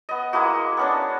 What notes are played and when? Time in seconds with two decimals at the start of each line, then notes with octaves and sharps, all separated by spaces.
0.09 B3 D#5
0.33 G#3 A#3 E4 F#4
0.77 B3 C#4 D4